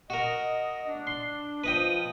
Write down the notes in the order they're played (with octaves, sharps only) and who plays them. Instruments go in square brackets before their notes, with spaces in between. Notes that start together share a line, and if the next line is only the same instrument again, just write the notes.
[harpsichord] F#4 A#4 [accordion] D#5
[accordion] D4
[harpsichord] C6
[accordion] F3 [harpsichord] B4 D#5 G5